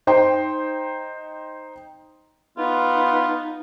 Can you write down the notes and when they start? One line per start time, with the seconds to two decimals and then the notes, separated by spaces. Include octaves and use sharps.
0.07 D#4 C5 G5 C6
2.58 B3 D#4 F4